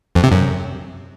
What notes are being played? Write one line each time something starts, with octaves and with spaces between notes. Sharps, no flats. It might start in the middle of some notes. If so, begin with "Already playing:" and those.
F2
C3
F#2